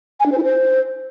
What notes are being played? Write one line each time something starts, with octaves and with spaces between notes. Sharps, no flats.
G#5
D4
C5
E4
C5